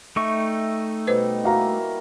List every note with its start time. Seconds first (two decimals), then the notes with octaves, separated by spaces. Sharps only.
0.16 A3 D#4 E5 G5 A5 C#6
1.07 B2 G3 B4 C5 D#5
1.44 A#3 E4 F#4 F5 A#5